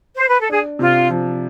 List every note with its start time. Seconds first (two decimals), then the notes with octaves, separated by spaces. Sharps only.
0.16 C5
0.27 B4
0.39 A4
0.49 D4 G#4
0.79 C3 F4
1.10 F3